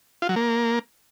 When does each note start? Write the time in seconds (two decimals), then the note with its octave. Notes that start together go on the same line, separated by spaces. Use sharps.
0.22 F4
0.29 F#3
0.36 A#3